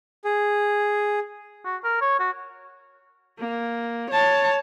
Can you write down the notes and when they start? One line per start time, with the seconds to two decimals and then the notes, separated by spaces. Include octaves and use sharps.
0.25 G#4
1.65 F#4
1.84 A#4
2.01 C#5
2.20 F#4
3.39 A#3
4.10 C#5 A5